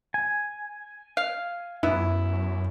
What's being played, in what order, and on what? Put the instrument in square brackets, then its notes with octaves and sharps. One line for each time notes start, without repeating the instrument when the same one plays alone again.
[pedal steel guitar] G#5
[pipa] F5
[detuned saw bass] F#2 [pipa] B3 [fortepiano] E4